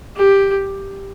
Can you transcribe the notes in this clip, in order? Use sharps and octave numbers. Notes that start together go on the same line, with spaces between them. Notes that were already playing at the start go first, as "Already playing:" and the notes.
G4